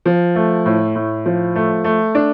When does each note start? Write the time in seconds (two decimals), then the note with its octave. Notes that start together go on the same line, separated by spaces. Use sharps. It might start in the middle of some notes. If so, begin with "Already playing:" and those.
0.06 F3
0.35 A3
0.66 A2
0.95 A2
1.26 F3
1.55 A3
1.84 A3
2.15 D4